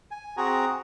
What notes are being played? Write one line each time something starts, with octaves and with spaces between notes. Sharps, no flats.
G#5
C4 F#4 G#4 A#5